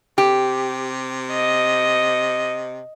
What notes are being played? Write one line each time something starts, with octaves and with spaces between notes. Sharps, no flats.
C3 G4
D#5